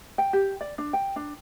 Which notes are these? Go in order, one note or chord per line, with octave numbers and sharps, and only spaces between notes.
G5
G4
D5
D4
G5
D4